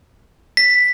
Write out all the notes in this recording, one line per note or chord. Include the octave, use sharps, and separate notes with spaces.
B6